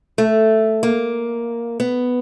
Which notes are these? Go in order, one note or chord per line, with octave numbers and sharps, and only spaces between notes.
A3
A#3
B3